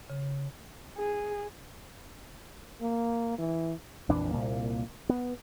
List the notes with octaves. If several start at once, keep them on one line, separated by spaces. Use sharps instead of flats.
C#3
G#4
A#3
E3
A#1 F2 E3 D4
C2 A#2 A#3
B3